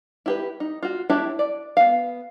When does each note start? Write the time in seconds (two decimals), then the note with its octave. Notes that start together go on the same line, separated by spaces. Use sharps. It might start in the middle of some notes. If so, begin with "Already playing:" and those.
0.26 E4 G4 B4
0.60 D#4
0.83 F4 F#4
1.10 D4 E4 G4 C#5 E5
1.39 D5
1.77 B3 F5